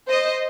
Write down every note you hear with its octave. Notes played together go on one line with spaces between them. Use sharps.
C5 D#5